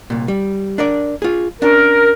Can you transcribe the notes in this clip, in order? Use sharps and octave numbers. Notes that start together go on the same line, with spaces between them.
C2 A#2
G3
D4 A#4 D5
F4 G#4
C#4 D4 A#4